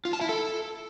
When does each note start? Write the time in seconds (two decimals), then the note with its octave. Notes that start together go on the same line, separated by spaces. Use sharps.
0.05 F4
0.13 A5
0.21 E4
0.29 A4